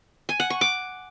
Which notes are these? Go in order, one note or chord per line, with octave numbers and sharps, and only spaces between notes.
G#5
F#5
C#6
D6